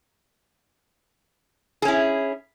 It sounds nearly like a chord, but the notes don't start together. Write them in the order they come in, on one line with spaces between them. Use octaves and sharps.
G#4 C#4 E4